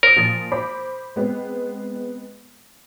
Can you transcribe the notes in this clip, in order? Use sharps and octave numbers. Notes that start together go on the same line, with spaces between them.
A#4 C5 D#6
A#2 F3 A6
C5 B5 D6
G#3 B3 C4